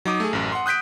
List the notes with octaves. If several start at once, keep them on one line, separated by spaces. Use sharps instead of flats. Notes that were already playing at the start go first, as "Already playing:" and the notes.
F#3 D#4 D6 D#6
A3 G#4
A1 F#2
F#5 C6
D#6 F#6 G6 B6 D7